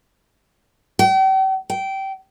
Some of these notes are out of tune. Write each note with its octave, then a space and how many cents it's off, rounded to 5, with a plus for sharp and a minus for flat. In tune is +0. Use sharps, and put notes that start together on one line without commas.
G5 -40
G5 -20